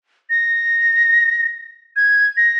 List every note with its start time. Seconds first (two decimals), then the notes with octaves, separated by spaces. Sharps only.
0.30 A#6
1.96 G#6
2.37 A#6